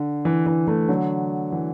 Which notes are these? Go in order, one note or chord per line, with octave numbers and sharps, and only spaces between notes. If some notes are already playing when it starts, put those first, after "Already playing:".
Already playing: D3
E3
E3
E3 A3
D3 F#3
E3